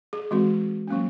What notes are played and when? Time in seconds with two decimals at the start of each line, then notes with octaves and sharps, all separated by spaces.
0.13 G#4
0.31 E3 G#3 C4 F#4
0.88 F#3 A#3 C#4